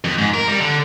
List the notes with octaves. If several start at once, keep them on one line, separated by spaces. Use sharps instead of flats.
F2
G#2
A#4
G3
D3